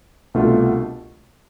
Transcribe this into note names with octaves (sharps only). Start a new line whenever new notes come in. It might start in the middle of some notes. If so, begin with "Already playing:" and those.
C2 B2 A3 D4 F4